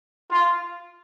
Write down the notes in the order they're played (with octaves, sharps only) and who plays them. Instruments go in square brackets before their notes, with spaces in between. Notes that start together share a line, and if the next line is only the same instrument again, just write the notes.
[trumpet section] F4